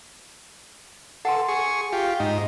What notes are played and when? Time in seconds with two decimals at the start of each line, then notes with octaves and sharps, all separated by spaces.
1.25 A4 F#5 G#5 C6
1.48 G#4 C#6
1.92 F4 G4
2.20 G#2 D#4